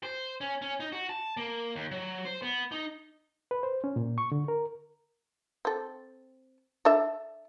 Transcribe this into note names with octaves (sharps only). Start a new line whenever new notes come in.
C5
C#4
C#4
D#4
F#4
A5
A#3
D#2
F#3
C5
B3
D#4
B4
C5
C#4
A#2
C#6
D3
A#4
C4 A4
D4 A4 E5